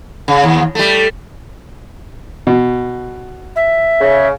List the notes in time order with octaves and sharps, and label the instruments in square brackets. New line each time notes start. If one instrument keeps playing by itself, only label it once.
[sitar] C#3
D#2
G3 A3
[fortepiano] B2
[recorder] E5
[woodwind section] C#3